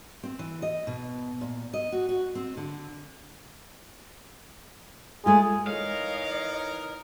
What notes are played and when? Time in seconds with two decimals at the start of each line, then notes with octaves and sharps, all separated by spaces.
0.23 C4
0.39 E3
0.62 D#5
0.87 B2
1.41 A#2
1.73 D#5
1.92 F#4
2.09 F#4
2.35 C4
2.57 D3
5.26 G#3 A3 F4 G#4
5.67 E3 D#4 A#4 C#5 D#5 F5